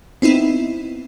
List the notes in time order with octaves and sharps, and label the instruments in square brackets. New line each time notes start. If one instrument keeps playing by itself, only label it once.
[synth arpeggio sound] B3 C4 D#4 E4